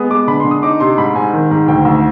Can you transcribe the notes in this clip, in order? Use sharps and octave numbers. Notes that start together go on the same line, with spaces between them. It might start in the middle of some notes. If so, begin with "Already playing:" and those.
Already playing: G#3 B3 D#6
G#3 D6
D3 B5
C6
D3
D#6
D#4 D6
C3 C6
G#2 B5
G#2 G#5
D#3
G#2
D2 G5
D2